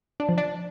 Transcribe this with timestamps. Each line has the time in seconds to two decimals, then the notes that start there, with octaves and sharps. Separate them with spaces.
0.20 D4
0.29 F3
0.38 D4